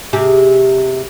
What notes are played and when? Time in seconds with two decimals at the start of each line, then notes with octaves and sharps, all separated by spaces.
0.13 C3 G4 G#4